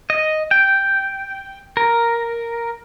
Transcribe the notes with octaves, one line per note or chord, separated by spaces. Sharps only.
D#5
G5
A#4